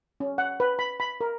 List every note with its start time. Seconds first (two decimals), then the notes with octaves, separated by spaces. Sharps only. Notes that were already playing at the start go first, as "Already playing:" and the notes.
0.20 C#4
0.38 F#5
0.60 B4
0.79 B5
1.00 B5
1.21 A#4